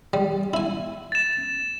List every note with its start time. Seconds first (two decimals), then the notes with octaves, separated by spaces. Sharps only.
0.13 G3
0.54 E4 G#5
1.12 A6 E7